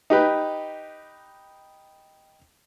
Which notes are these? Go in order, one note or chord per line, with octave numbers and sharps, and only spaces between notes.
D#4 G4 B4